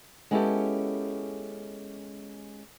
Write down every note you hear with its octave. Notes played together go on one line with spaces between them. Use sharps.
G#3 B3 C#4 E4 G4 A4